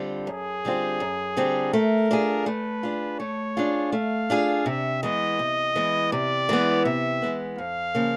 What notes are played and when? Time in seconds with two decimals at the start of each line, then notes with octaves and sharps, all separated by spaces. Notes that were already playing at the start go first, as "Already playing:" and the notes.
Already playing: D3 G3 C4 F4
0.27 F#2 G#4
0.65 D3 G3 C4 F4
1.00 F#2
1.37 D3 G3 C4 F4
1.73 A3 A#4
2.11 D4 F4 G#4
2.46 A3 B4
2.83 D4 F4 G#4
3.19 A3 C#5
3.57 D4 F4 G#4
3.92 A3 F5
4.30 D4 F4 G#4
4.66 C3 E5
5.02 E3 G#3 B3 D#5
5.39 C3
5.75 E3 G#3 B3
6.12 C3 D5
6.49 E3 G#3 B3
6.85 C3 E5
7.22 E3 G#3 B3
7.58 F2 F5
7.95 C#3 F3 A#3